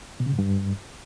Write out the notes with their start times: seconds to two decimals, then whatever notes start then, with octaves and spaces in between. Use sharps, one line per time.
0.20 B2
0.26 C#3
0.32 G#2
0.39 G2